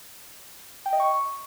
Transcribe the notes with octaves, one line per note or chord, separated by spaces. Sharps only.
G5
D#5
C#6